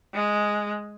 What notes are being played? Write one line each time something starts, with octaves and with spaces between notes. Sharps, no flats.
G#3